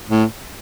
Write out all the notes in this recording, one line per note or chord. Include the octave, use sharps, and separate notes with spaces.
A2